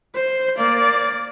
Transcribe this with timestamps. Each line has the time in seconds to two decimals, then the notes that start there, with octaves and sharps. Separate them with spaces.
0.15 C5
0.56 A#3 D5